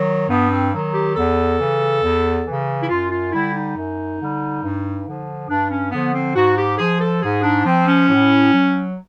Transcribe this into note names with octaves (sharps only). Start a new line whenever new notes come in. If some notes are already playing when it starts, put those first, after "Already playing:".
Already playing: D#3 F#3
G2 B3
C4
D#3 F#3
G4
E2 A4
C#3 E3
E2
C#3 E3
E4
F#2 F4
F4
D3 G3 E4
D#4
F#2
D3 G3
G2
D3 F3
G2 D4
C#4
D3 F3 B3
C4
G#2 F#4
G4
F3 G#4
A4
G#2 G#4
D4
F3 C4
C#4
A2
F#3